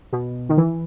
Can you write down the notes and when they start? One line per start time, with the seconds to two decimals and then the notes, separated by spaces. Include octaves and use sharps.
0.13 B2
0.49 D#3
0.57 E3